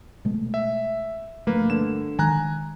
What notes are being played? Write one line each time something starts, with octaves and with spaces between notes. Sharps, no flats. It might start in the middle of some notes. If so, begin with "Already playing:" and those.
B2 G#3 A3
E5
G2 F3 A3 A#3 B4
D3 E7
D#3 G#3 G#5 A#5 F#6